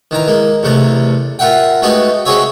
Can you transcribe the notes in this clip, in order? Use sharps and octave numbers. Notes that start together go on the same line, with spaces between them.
D#3 E3 A#5
G#3 A#3
E2 C3 A3 A#5
F4 A#4 E5 F#5 G5
G#3 A3 B3 D#4 F#4 G4
G#3 C4 F#4 G#4 C#5 E5